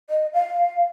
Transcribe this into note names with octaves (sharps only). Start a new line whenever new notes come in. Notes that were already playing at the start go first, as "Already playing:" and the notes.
D#5
F5